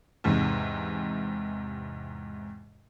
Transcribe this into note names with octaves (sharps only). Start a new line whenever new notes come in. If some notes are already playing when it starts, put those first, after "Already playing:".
E2 G#2 C3